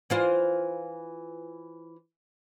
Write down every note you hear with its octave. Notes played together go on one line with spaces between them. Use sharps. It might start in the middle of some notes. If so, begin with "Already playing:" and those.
E3 F4 C5